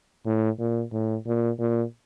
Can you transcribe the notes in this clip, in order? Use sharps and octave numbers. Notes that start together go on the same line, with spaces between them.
A2
A#2
A2
A#2
A#2